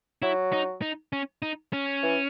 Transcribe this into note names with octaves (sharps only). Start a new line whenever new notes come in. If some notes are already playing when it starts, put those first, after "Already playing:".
F#3 E4
D#4
D#4
C#4
D#4
C#4
E3